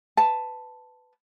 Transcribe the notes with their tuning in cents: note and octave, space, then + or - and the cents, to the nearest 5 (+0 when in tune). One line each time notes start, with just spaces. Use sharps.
B4 +15 A5 +0